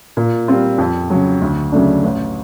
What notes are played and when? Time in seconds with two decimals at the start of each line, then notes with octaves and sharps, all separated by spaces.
0.17 A#2
0.48 G3 C4 F4
0.78 F2
1.10 C#3 F#3
1.42 D2
1.72 C#3 F#3 A3 D4
2.03 A1